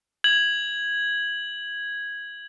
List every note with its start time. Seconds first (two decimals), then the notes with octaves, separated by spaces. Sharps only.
0.24 G#6 F#7